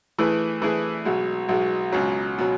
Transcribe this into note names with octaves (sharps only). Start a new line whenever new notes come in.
E3 A3 E4 G#4 B4
E3 A3 E4 G#4 B4
B1 B2 G#3
B1 B2 G#3
C#2 B2 F#3
B2 F#3